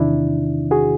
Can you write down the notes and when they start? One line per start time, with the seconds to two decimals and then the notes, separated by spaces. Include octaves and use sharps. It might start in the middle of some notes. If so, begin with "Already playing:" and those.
Already playing: E2 C3 D#3 D4 E4
0.71 F#4 G#4